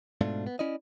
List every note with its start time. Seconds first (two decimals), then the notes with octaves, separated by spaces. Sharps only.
0.21 G#2 B2 A3 D4 F4
0.47 B3
0.59 C#4 E4 D5 D#5